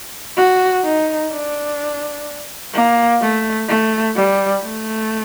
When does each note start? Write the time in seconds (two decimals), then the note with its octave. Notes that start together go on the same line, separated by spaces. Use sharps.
0.37 F#4
0.84 D#4
1.31 D4
2.73 A#3
3.21 A3
3.68 A3
4.16 G3
4.63 A3